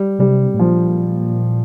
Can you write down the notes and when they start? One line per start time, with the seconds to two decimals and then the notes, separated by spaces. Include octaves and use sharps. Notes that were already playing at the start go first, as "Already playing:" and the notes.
Already playing: G3
0.19 C3 G3
0.54 A2
0.60 A#2 F3